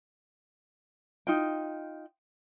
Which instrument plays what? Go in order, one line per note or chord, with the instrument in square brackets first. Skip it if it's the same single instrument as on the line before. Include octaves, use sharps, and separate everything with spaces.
[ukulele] D#4 F4 G5